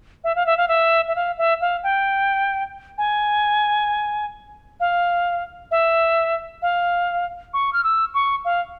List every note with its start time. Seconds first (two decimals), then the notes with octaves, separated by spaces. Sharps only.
0.24 E5
0.36 F5
0.46 E5
0.57 F5
0.68 E5
1.08 E5
1.16 F5
1.38 E5
1.61 F5
1.83 G5
2.98 G#5
4.80 F5
5.71 E5
6.62 F5
7.54 C#6
7.73 F6
7.84 E6
8.14 C#6
8.45 F5